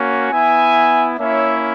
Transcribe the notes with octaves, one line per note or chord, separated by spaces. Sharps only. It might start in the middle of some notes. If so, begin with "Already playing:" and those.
Already playing: A#3 C#4 F#4
B3 E4 E5 G#5
A#3 C#4 E4 C#5 E5